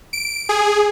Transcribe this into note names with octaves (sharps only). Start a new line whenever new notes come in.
D7
G#4